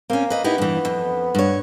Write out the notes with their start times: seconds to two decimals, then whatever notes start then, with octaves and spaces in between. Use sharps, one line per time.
0.10 A#3 C4 C#4
0.30 B4 D#5
0.44 B3 D#4 E4 G4
0.58 G2 E3
0.85 F2
1.35 G2 C#5